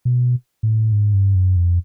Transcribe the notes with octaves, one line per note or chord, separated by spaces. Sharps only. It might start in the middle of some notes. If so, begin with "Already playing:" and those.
B2
A2
G#2
G2
F#2
F2